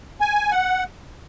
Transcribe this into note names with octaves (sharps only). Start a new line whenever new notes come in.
G#5
F#5